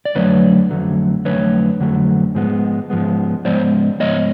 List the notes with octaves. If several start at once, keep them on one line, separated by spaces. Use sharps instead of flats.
D5
F2 D3 F#3 A3 B4 C#5
F2 D3 F#3 A3
F2 D3 F#3 A3 B4 C#5
F2 D3 F#3 A3
G#2 F3 G#3 B3
G#2 F3 G#3 B3
G#2 F3 G#3 B3 C5 D5
G#2 F3 G#3 B3 C#5 D#5